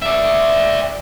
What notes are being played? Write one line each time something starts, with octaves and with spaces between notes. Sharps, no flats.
D5 E5